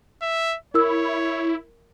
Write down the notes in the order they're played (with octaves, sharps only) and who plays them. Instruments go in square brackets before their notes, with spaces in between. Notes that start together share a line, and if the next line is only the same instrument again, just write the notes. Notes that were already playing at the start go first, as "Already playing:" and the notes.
[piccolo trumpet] E5
[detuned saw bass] E4 [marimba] A#4 E6 [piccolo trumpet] C#5